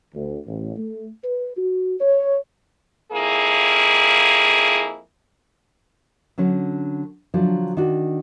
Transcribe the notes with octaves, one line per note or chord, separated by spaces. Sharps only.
D2
A1
A3
B4
F#4
C#5
F2 A#3 E4 G#4
D3 F#3 C#4 C#5
D3 F3 F#3 D4
D#3 D4 F#4